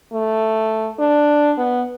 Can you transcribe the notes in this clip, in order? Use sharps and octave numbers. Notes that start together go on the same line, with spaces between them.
A3
D4
B3